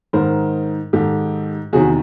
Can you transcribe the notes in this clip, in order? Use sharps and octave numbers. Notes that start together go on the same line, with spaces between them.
G#2 D#3 A#4 C5
G#2 D#3 G4 A4
E2 C3 D#3 F#4 G#4